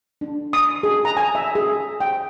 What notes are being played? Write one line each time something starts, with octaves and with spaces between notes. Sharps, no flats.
D4
D#6
G#4
A#5
G#5
E5
G#4
G5